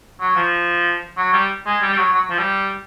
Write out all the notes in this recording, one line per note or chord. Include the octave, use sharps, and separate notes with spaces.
F#3
F3
F#3
G3
G#3
G3
G3
F#3
F#3
F3
G3